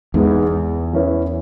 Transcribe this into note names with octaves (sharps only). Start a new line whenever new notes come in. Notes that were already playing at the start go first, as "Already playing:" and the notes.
E2 G#2 G#3 B3
E3 C#4 E4 B4